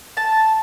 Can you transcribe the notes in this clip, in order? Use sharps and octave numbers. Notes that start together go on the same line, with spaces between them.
A5